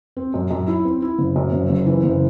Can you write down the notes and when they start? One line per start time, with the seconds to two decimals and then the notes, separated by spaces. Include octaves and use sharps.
0.17 C4
0.34 F#2
0.51 F#2
0.68 E4
0.85 C4
1.02 E4
1.18 F#1
1.36 F#2
1.52 F#1
1.69 F#1
1.86 E3
2.03 F#1